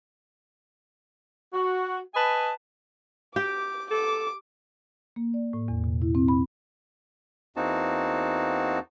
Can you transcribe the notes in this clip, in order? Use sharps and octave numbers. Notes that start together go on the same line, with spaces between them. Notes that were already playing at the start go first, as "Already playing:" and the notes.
F#4
B4 D#5 G#5 A5 B5
G4 D6
A4 D6
A#3
D5
A2
E2
B2
E4
C4
B5
E2 A#3 C4 D#4 F#4 A5